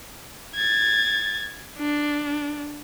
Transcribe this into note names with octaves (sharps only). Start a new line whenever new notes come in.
G#6 A6
D4